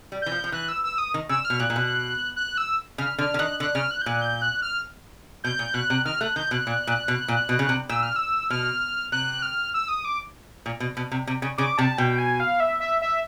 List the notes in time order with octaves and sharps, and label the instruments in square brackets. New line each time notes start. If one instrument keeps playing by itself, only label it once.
[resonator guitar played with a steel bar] G3
[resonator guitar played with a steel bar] E3 [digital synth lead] G6
[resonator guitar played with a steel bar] F3
F3
[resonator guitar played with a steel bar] E3 [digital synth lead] F#6
[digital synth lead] E6
E6
D#6
[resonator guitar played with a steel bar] D#3
[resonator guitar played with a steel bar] C#3 [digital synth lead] E6
[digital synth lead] F6
[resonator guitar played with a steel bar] B2
[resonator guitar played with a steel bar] A#2 [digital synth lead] F#6
[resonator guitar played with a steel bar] A#2
B2
[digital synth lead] F#6
E6
[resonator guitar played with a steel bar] C#3 [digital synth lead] F6
[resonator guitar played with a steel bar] D3 [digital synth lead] F6
[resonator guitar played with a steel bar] D3
[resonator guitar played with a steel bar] D#3 [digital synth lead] F#6
[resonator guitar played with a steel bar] D3 [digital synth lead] F#6
[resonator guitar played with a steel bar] C#3 [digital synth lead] F6
[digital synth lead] F#6
G6
[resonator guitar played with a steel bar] A#2 [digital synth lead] F#6
[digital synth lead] G6
F#6
F6
[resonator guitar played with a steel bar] B2 [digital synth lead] G6
[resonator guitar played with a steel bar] A#2
[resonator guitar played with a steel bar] B2 [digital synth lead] F#6
[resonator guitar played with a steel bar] C3
[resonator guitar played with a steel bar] D#3 [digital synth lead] F6
[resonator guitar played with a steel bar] A3 [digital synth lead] F#6
[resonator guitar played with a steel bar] D#3 [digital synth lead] G6
[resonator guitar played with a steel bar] B2 [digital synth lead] F#6
[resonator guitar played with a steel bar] A#2
A#2
B2
A#2
B2
C#3
C3
[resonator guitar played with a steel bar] A#2 [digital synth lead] E6
[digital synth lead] F6
E6
[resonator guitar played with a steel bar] B2 [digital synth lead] F6
[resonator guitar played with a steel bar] C3 [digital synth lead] F#6
[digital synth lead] F6
E6
D#6
D6
[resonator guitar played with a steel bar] A#2
B2
B2
C3
C3
C#3
[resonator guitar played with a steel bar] C#3 [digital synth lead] D6
[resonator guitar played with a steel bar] C3 [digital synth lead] A5
[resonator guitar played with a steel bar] B2 [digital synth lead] G5
[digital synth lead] G#5
F5
E5
E5
E5